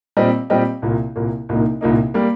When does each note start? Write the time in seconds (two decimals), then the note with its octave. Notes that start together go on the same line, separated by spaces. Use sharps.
0.17 A#2 G3 C4 G4 D#5
0.50 A#2 G3 C4 G4 D#5
0.82 C2 A#2 A#3
1.16 C2 A#2 A#3
1.49 C2 A#2 A#3 D#4
1.81 C2 A#2 A#3 D#4
2.14 G3 A#3